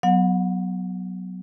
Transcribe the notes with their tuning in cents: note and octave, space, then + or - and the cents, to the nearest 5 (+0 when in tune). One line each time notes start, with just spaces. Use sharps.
F#3 +0 B3 +0 F#5 -35